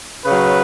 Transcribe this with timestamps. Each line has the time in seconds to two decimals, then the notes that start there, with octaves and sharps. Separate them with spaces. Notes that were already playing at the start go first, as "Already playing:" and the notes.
0.25 C#3 F#3 B4